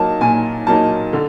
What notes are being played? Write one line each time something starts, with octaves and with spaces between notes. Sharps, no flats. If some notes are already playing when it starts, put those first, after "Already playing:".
Already playing: F#3 A#3 D#4 A5
A#2 G#5
F#3 A#3 D#4 A5
D3